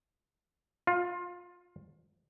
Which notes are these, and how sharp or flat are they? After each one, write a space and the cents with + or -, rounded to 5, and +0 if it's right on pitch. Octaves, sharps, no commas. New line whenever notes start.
F4 +20